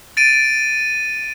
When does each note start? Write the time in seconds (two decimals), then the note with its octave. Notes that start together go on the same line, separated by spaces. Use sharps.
0.17 A6 D7 D#7